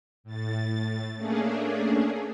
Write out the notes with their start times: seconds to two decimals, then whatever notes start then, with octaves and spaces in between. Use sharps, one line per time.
0.24 A2 A6
1.15 A3 A#3 C#4 D4 G#4